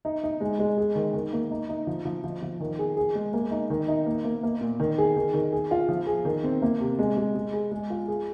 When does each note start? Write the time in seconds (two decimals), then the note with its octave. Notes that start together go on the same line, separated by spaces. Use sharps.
0.05 D#4
0.24 D#4
0.41 G#3
0.59 G#3
0.78 G#4
0.95 D#3
1.14 D#3
1.33 A#3
1.51 D#4
1.69 D#4
1.87 F3
2.05 F3
2.24 F3
2.42 F3
2.60 D#3
2.79 G#4
2.97 G#4
3.15 G#3
3.33 A#3
3.51 D#4
3.70 D#3
3.88 D#4
4.06 A#3
4.24 A#3
4.43 A#3
4.61 A#2
4.80 D#3
4.98 G#4
5.16 D#3
5.34 D#3
5.52 G#4
5.71 F4
5.89 F3
6.07 G#4
6.25 D#3
6.44 C4
6.62 A#3
6.80 C3
6.99 G#3
7.17 G#3
7.35 G#3
7.53 G#4
7.72 G#3
7.90 F4
8.08 G#4